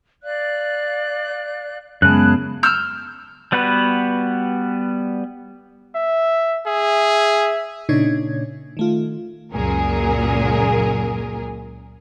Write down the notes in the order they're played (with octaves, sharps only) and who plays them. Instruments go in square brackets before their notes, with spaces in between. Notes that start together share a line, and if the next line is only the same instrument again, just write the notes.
[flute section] D5 F5 F#6
[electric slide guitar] F#2 C#3 [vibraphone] G#3 B3 [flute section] G#4 A5 B5 [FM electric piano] F#6
[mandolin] E6 F6 G6
[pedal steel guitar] G3 B3 F#4 B4
[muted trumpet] E5
[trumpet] G#4 [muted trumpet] E5
[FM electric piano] A#2 C#3 D4 D#4 C#5 G#6
D#3 A3 F4
[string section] C#2 F#2 A#2 G#4 A#4